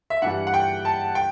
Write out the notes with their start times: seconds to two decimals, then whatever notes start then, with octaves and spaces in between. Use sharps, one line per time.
0.10 E5
0.22 G2 E3 G3 F#5
0.47 F#5
0.54 G5
0.85 A5
1.15 G5